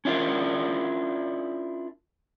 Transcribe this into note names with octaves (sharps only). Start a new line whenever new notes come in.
C#4 D4 E4 F4 A#4 D5